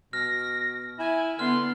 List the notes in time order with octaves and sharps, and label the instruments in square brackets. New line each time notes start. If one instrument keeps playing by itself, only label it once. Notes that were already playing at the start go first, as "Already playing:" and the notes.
[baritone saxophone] B2 [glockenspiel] F6 [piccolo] A#6
[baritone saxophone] E4 [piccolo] G#5
[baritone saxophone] D3 [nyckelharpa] B3 [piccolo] C6 [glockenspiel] F6